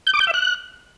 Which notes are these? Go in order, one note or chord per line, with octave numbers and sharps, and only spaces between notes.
G6
D6
G6
E5
F#6